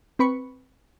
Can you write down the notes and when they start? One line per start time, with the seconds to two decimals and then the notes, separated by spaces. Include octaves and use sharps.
0.19 C4 B4 B5 C#6 C#7